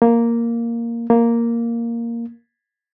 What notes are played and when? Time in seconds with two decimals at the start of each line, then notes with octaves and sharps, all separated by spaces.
0.02 A#3
1.10 A#3